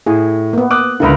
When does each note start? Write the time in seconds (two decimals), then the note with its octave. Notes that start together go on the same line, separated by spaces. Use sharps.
0.06 A2 G#4
0.53 A#3 B3
0.71 D6 D#6 F#6
1.00 C#2 D3 E4 A#4 B4